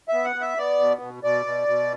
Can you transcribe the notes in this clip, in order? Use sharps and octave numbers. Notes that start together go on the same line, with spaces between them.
B3 E5
F#5
B3
E5
B3 D5
B2
B2
B2 D5
B2
B2